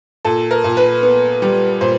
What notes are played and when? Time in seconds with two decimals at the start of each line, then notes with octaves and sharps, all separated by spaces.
0.25 A#2 A4
0.51 A#4
0.64 A#2
0.77 B4
1.03 B3
1.42 G3
1.81 A#2 C5